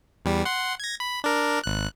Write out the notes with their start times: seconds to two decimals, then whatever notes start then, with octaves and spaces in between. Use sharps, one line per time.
0.25 E2 G3
0.45 F#5 C6
0.80 G#6 A#6
1.00 B5
1.24 D4 A#4
1.64 G#1 F#6